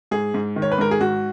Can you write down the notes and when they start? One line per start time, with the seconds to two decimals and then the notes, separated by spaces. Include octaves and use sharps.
0.11 G#2 G#4
0.34 G#2
0.56 D#3
0.62 C#5
0.72 B4
0.78 G#2 A#4
0.91 G#4
1.01 G#2 F#4